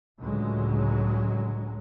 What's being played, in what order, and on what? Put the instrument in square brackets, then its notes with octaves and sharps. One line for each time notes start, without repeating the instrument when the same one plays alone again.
[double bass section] C#2 A2 D3 F#3 G#3